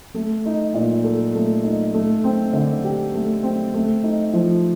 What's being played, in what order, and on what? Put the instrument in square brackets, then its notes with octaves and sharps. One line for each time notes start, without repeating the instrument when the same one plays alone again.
[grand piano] A3
D#4
A#2
A4
A3
D#4
A3
C4
D3
G4
A3
C4
A3
D#4
F3